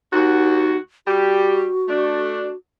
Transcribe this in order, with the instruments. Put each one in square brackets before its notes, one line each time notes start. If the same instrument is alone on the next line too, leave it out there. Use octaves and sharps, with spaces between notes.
[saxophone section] D#2 F#4 [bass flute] D#4
[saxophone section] G3 G4 [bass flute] F#4
[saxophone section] A3 D4